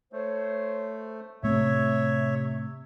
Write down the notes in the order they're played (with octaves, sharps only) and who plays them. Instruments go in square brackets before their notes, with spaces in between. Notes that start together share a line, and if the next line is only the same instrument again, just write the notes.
[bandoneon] A3 [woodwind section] C5 C#5
[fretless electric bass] A2 A3 C4 [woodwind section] C3 [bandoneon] C#5 E5